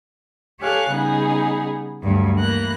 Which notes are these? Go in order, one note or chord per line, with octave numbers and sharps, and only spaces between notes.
G4 A4 C#5 F5 G#5 F#6
C#3 G3 B3 D#4 G#4
D2 G2 F#3
E3 A#3 F#6 A#6